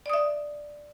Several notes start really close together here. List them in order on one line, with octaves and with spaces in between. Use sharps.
D5 D#6 E5